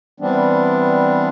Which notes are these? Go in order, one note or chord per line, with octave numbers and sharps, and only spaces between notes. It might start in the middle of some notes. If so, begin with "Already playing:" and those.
E3 G3 B3 C4 D4